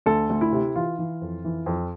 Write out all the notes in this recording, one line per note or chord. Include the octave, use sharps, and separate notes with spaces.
D2 A4
D2
E4
C3
E3 F4
E3
F2
E3
F2